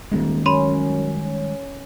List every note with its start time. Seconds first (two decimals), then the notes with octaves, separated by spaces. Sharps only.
0.12 D#1 D#3 G3 G#3
0.46 F#2 C#4 B5 C6 D#7